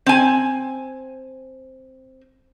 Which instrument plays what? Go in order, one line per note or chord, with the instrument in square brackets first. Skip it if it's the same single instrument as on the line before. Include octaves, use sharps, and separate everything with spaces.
[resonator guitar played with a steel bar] C4 G#5